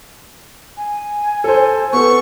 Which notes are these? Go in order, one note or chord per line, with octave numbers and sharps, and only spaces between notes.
G#5
A4 C5
B3 A4 C#6